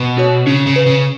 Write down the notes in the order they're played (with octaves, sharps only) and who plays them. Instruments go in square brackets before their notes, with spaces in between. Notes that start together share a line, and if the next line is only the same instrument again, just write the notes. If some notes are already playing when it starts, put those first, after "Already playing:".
Already playing: [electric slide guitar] B2
[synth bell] B3 F#4 C#5
[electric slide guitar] C#3 [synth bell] C#4
[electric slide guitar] C#3
[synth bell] B4
[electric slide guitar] C#3